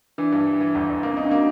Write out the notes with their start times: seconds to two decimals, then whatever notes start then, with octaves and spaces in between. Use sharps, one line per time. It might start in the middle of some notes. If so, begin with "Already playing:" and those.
0.18 E3 D4
0.32 G2
0.47 E3
0.60 E3
0.75 G1
0.89 G1
1.03 A#3 C4
1.14 C#4 D#4
1.24 D4
1.31 A#3 F#4